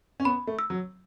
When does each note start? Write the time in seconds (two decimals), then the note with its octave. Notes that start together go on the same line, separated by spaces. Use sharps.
0.20 C#4
0.25 B3 B5
0.47 A3
0.59 E6
0.70 F#3